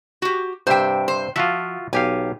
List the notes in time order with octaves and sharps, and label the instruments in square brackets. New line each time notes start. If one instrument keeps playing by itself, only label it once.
[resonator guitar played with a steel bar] F#4 G4
[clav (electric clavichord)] G2 C3 E5 [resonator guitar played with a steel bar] C5 G5
[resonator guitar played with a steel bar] C5
[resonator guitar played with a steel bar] F3 [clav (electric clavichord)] F4 F#4 E5
[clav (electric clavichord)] B1 G4 F5 [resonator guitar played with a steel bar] G#5